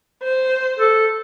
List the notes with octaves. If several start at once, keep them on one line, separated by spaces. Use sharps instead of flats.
C5
A4